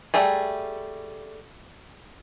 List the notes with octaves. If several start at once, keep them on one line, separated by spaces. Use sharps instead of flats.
G3 A3 G#4